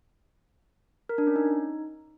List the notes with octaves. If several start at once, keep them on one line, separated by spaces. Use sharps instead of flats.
A#4
D4
C#4
D#4